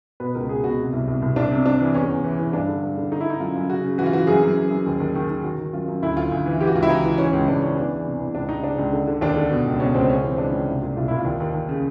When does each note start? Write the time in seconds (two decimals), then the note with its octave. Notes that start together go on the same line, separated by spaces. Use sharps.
0.20 B2 B4
0.34 C#2 A#4
0.49 B2 G#4
0.64 B2 F#4
0.79 C3
0.93 C2
1.08 C2
1.22 C2
1.36 C2 D4
1.51 C3
1.66 C3 D4
1.80 E3
1.94 E2 C#4
2.09 E2
2.24 E3
2.39 E3
2.53 G2 D4
2.68 D3
2.83 G2
2.97 D3
3.12 D3 D#4
3.21 E4
3.25 D3 D#4
3.40 F#2 F4
3.55 F#2
3.70 C#3 F#4
3.84 C#3
3.98 E3 F#4
4.06 F4
4.13 E3 F#4
4.27 F#2 G#4
4.43 F#2
4.57 F#2
4.71 F#2
4.86 D#2
5.00 D#2
5.15 D#3
5.30 D#3
5.44 D#3 F#4
5.59 D#3
5.73 F#2 F4
5.88 F#2
6.02 D2 E4
6.16 D2 F4
6.32 D2
6.46 E3
6.60 E3 G4
6.67 F#4
6.75 C#2 F4
6.83 E4
6.89 E3 D#4
7.04 E3
7.18 E3 C#4
7.33 C#2
7.48 C#2 D4
7.62 E3 C#4
7.76 E2 D4
7.92 E3
8.06 C3
8.20 E2
8.35 C#2 D4
8.49 C#2 D#4
8.64 C#3 D4
8.78 C#2
8.93 D3
9.08 D3
9.21 D#2 D4
9.36 D3
9.51 B2
9.66 C#2
9.80 B2 C#4
9.94 C#2 C4
10.09 C#3 C#4
10.24 E3 C4
10.38 C#2 D4
10.52 C#2
10.67 C2
10.82 A#2
10.97 C2 F4
11.08 C2 E4
11.19 F4
11.25 D#2
11.40 D#2
11.54 D#2
11.69 C#3